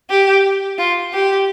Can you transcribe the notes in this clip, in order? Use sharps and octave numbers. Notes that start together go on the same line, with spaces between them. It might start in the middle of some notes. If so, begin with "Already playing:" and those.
G4
F4
G4